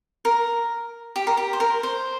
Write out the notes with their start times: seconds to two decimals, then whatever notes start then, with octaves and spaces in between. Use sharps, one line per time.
0.25 A#4
1.16 G4
1.27 A#4
1.37 G4
1.53 C5
1.60 A#4
1.83 C5